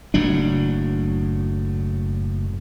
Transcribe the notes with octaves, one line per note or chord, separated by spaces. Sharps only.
F#1 A2 F#3 D4